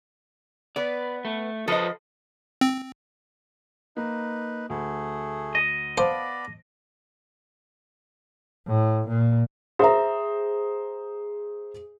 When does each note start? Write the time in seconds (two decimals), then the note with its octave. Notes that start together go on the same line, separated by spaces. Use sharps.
0.76 B3 B4 D5
1.25 A3
1.68 F3 A4 B4 C5 D#5
2.61 C4
3.97 A#3 D#4 B4
4.70 D2 A3 G#4
5.55 D#5
5.98 B3 C5 D5 F5 A5 B5 D6
8.67 A2
9.08 A#2
9.79 G#4 C5 E5 A#5